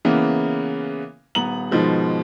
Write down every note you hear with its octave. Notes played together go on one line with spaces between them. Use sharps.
C#3 E3 A#3 B3
D#1 B3 A#5 F#7
G#2 B2 D#3 F3 G#3